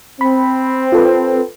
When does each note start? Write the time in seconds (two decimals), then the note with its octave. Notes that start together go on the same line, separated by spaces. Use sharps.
0.21 C4 B5
0.92 F4 A4 B4